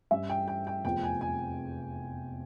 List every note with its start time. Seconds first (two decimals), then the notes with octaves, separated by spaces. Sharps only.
0.11 G2 G3 C#4 E5
0.29 G5
0.48 G5
0.67 G5
0.84 F1 E2 C3 F3 G5
1.03 G#5
1.21 G#5